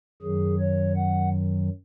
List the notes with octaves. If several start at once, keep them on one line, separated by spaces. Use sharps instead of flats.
F#2 D#3 F#3 G#4
C#5
F#5